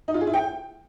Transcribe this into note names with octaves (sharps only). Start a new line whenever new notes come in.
D#4
F4
G#4
E4
G5